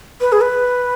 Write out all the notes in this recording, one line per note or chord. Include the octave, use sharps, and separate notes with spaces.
B4
G#4
B4